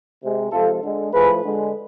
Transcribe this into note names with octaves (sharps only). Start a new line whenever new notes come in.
C3 G#3
C3 F3 G#3 F4 A4
D3 G#3
A2 F3 A3 G#4 B4
D3 G#3